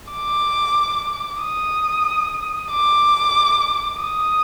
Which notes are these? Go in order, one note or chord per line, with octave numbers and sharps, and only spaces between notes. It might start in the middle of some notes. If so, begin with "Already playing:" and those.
D6
D#6
D6
D#6